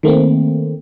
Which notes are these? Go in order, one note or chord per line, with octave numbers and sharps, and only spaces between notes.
D#3 A3 A#3 C4